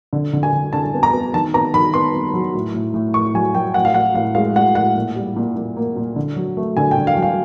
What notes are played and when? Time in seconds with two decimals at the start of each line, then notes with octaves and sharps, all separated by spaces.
0.13 D3
0.33 D3
0.43 G#5
0.53 D3
0.73 D3 A5
0.94 B3
1.03 A#5
1.13 B3
1.34 D#3 A5
1.54 B3 A#5
1.73 D#3 B5
1.94 B3 C6
2.14 B3
2.34 F#3
2.54 A2
2.74 A2
2.94 A2
3.14 A2 C#6
3.34 F#3 G#5
3.55 F#3 G5
3.74 A2 F#5
3.85 F5
3.94 A2 F#5
4.15 A2 F5
4.35 G#3 F5
4.56 G#3 F#5
4.75 A2 F#5
4.95 A#2
5.16 G3
5.36 A#2
5.56 A#2
5.77 A#3
5.96 A#2
6.16 D3
6.36 F#3
6.57 A3
6.77 D3 G#5
6.91 G5
6.97 D3
7.07 F5
7.17 F#3
7.22 F5